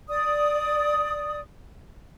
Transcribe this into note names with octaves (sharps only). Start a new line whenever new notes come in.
D5 D#6